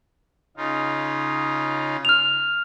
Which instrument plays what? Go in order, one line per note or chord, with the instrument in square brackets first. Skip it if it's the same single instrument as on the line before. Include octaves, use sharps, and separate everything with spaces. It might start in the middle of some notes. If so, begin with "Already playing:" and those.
[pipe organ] C#3 D#4 F4
[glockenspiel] F6 F7